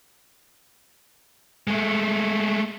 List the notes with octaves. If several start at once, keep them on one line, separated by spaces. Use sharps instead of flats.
G#3 A3